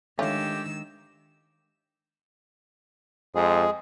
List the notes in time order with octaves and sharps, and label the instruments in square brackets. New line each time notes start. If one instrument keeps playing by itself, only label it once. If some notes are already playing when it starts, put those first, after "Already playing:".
[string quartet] D#3 E6 [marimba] G#3 D4 [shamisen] A3 C#4 F4 [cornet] G4
[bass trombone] F2 [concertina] G#3 G#4